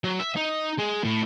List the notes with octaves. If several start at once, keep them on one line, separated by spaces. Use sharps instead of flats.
F#3
E5
D#4
G#3
A2